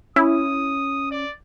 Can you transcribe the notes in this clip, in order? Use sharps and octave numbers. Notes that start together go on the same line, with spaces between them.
C#4 E4 D#6
D5